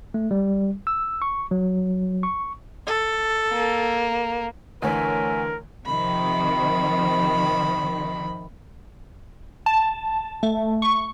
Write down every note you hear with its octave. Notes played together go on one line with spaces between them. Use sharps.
A3
G3
E6
C#6
F#3
C#6
A4
A#3
D2 D3 E3 A#4 C#5 E5 G#5
C3 D#3 F3 B5
A5
A3
C#6